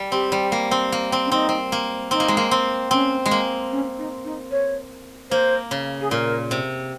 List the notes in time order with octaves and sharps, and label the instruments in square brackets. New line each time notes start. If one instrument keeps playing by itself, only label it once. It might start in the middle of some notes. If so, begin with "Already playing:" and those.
Already playing: [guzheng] G3
[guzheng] C4 [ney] G4
[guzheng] G3
A#3
C4
A#3
C4
[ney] C#4
[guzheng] C4 [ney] D#4
[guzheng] C4
A#3
[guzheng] C4 [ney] D#4
[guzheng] A#3
G#3
A#3
C4
[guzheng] C4 [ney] C#4
[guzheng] G#3
A#3
[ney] C#4
D#4
D#4
C#5
[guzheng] A#3 [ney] C5
[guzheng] C#3
[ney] G#4
[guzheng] A#2 [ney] A#4
[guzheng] C3